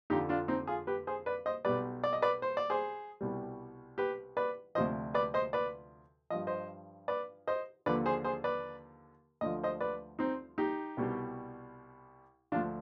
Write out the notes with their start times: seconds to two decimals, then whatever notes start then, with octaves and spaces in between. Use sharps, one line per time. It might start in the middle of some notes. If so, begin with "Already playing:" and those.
0.10 F2 D3 F3 D#4 G4
0.29 D4 F4
0.48 C4 D#4
0.67 F4 G#4
0.87 G4 B4
1.07 G#4 C5
1.26 B4 D5
1.46 C5 D#5
1.65 B1 B2 G3 B4 D5
2.04 D5
2.13 D#5
2.22 B4 D5
2.42 C5
2.57 D5
2.70 G#4 C5
3.21 C2 B2 G3
3.98 G4 B4
4.37 B4 D5
4.75 D2 C3 F3 C5 D#5
5.14 B4 D5
5.34 C5 D#5
5.53 B4 D5
6.30 G2 F3 D#5
6.47 C5 D#5
7.08 B4 D5
7.47 C5 D#5
7.86 D#2 D3 F3 B4 D5
8.06 G#4 C5
8.24 G#4 C5
8.44 B4 D5
9.41 D2 D3 F3 D#5
9.63 C5 D#5
9.81 B4 D5
10.19 C4 D#4
10.58 D#4 G4
10.97 C2 B2 G3
12.52 D2 D3 F3 D4 F4